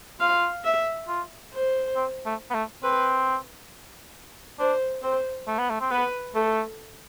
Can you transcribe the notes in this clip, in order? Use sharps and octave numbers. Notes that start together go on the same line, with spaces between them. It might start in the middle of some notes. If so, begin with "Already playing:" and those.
F4 F5
E5
F4
C5
C4
A3
B3
A3
C4 B4
D4 C5
C4 C5
A3
B3
A3
C4
B3 B4
A3 A4